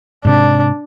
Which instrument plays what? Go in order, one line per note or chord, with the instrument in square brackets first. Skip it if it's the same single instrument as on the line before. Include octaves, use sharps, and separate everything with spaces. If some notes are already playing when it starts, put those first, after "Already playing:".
[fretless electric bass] G#2 C3 [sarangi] D4